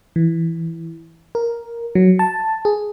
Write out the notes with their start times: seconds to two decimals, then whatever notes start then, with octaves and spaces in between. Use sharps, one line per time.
0.16 E3
1.35 A#4
1.95 F#3
2.19 A5
2.65 G#4